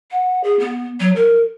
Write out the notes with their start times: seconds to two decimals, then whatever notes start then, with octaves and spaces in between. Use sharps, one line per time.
0.11 F#5
0.44 G#4
0.60 B3
1.00 F#3
1.16 A#4